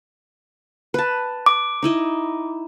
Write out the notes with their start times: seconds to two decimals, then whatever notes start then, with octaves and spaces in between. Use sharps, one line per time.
0.94 B4 A5
1.46 D6
1.83 D#4 E4 D#5